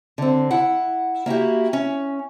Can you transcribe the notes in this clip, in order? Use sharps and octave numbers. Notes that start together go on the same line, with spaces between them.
D3 C4
E4 F#5
A#3 E4 F#4 G4
C#4